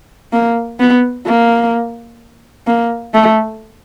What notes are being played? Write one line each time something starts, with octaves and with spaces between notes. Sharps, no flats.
A#3
B3
A#3
A#3
A3